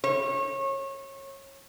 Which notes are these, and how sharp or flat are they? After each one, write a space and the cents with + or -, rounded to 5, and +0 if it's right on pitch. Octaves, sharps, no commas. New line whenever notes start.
C#5 -25